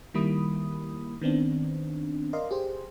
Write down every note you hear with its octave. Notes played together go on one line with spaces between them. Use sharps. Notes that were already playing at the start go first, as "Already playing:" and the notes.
D#3 G3 A#3 E4 B5 D#6
D#3 B3 C4 D4
A#4 D5 D#5 F5 C6
G4 G#4 C5